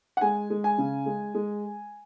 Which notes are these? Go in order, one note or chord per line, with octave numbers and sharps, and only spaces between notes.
F#5
G#3 G#5
G#3
G#5
C#3
G#3
G#3